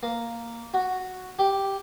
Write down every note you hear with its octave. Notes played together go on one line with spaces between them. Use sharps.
A#3
F#4
G4